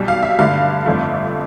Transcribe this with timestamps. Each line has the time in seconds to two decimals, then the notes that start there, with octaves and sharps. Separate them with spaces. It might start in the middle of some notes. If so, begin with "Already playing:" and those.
Already playing: B1 B2 G3
0.08 F5
0.23 E5
0.39 G2 D3 A3 F5
0.86 G1 F2 D3 A3